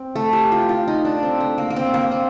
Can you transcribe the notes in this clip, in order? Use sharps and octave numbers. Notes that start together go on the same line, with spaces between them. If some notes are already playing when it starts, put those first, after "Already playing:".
Already playing: C4
A3
G4
F4
F4
D#4
D4
C4
A3
A#3
A#3
C4
A#3
C4